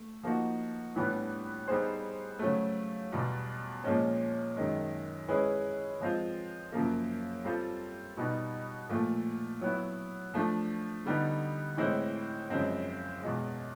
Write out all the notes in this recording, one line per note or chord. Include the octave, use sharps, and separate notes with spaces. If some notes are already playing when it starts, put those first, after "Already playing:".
Already playing: A3
F3 A#3 D#4 F#4
A2 E3 G3 B3 D4
G3 B3 D#4 G#4 C5
C#3 F#3 A3
E2 B2 G3
A#2 F3 G#3 C#4
F#2 D#3 G#3
G#3 C#4 E4 G#4 B4
F3 G#3 C4 F4
F#2 C#3 F3 A#3
G3 C4 F4 A4
B2 G3 B3 D#4
A#2 F3 A3
F#3 B3 E4
F3 A3 D4
D3 G3 B3 D#4
A2 E3 G#3 C4 E4
F#2 C#3 F3 G#3 C4
E2 B2 G#3